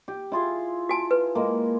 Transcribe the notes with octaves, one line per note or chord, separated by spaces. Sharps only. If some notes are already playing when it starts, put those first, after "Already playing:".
G4
E4 F4 G#4
F#4 G#5 A5
B4
G#3 A#3